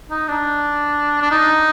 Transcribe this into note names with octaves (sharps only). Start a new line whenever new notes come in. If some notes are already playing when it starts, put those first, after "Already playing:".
D#4
D4
D4
D#4